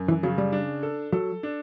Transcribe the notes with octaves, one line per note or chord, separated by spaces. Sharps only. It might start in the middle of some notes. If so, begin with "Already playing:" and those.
Already playing: F#2
E3
C#3 F#3
G3
D4
A4
F#3 A4
D4